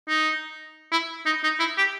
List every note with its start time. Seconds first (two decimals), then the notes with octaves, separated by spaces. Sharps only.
0.08 D#4
0.92 E4
1.26 D#4
1.43 D#4
1.59 E4
1.78 G4